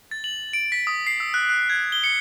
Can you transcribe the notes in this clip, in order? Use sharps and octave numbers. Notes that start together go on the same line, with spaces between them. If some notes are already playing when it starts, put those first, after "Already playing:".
A6
F#7
D7
B6
D#6
C7
E6
F#6
F#6
G#6
G7
C#7